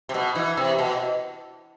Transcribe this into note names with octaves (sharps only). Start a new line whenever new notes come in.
C3
B2
E3
C3
B2